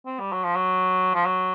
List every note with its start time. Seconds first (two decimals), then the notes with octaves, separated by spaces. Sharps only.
0.06 C4
0.19 G3
0.32 F#3
0.44 F3
0.55 F#3
1.14 F3
1.25 F#3